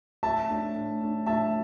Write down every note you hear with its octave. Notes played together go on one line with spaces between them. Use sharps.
A2 E5 A5
A3 D4
A2
A3 D4
A2 E5 A5